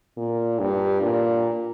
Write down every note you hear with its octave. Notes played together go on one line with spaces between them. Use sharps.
A#2
G2
A#2